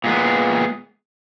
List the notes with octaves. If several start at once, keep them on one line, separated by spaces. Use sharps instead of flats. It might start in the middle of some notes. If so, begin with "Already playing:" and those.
A#2 G#3 B3